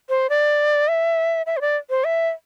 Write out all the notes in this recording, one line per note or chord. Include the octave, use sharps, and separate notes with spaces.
C5
D5
E5
E5
C5
D5
C5
E5